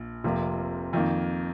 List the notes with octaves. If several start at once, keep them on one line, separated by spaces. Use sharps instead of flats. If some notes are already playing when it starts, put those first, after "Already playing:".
Already playing: A#1
F1 F2 C3 F3 A#3
F2 D#3 A#3